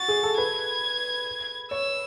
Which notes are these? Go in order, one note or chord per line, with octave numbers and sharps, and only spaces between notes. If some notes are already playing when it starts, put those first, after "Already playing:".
Already playing: F#4 A6
G#4
A4
B4 G#6
C#5 E6